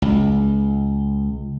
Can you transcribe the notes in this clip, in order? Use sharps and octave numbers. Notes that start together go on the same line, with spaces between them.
C#2